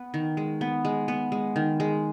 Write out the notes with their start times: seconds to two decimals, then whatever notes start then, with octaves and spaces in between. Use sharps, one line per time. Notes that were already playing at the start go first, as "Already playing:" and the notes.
Already playing: B3 B4
0.14 D#3
0.37 G#3
0.61 B3
0.85 G#3
1.08 B3
1.32 G#3
1.56 D#3
1.80 G#3